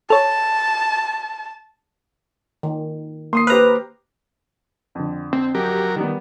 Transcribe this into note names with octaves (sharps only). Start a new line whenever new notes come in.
A4 C#5 A5
D#3
A#3 C6 D#6 C7
G4 B4 C5 A#5 F6
F2 D3
C4
F#3 G4 A#4
D#3 G3 B3